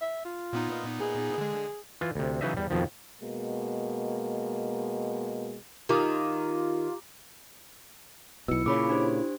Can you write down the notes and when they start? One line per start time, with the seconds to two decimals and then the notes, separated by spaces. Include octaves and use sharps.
0.01 E5
0.25 F4
0.53 A#2 B3 D#4
1.01 G#4
1.38 D3 G#3
2.01 E3 F4
2.15 D2 C3
2.41 C#3 E3 F#3 D#4 D#5 E5
2.57 E2 G3
2.70 F2 B2 D#3 F3
3.21 B2 G#3 A#3
5.89 D#3 F4 G4 A#5 D6
8.48 B1 B2 E4 E6 C#7
8.66 A#2 C#3 C#5 B5 D6
8.89 D4 G4 C5